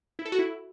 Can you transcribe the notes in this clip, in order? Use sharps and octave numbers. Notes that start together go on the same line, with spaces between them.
E4
A4
F#4
E4